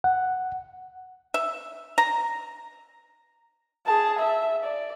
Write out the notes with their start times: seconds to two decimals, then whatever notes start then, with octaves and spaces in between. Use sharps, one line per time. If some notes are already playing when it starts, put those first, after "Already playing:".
0.04 F#5
1.34 E5
1.98 A#5
3.86 G#4 A5
4.19 E5
4.64 D5